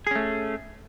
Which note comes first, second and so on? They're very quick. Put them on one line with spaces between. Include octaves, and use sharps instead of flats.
G#4 C#4 A3